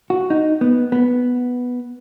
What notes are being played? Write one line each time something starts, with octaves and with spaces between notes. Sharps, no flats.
F#4
D#4
B3
B3